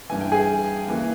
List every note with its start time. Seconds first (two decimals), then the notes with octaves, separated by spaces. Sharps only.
0.09 G2 E3 G#5
0.21 G5
0.32 G#4 G#5
0.87 D#2 C#3 E3